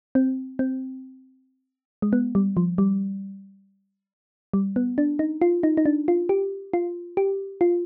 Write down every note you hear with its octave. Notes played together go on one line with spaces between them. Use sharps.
C4
C4
G#3
B3
G3
F3
G3
G3
B3
D4
D#4
F4
D#4
D#4
D4
F4
G4
F4
G4
F4